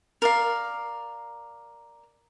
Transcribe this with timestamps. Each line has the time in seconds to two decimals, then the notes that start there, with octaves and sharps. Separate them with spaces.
0.22 A#4 D5 F5